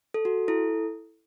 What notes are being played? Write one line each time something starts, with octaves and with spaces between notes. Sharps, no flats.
A4
F#4
E4 A4